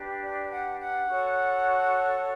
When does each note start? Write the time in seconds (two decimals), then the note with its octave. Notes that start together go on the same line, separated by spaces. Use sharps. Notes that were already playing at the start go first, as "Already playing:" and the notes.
Already playing: D4 G4 B4
0.22 D5
0.50 F#5
0.80 F#5
1.08 F#4 A4 C#5